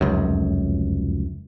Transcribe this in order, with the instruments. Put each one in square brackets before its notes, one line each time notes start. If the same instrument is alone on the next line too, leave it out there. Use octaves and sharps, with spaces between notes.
[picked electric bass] F1 C#2 F#2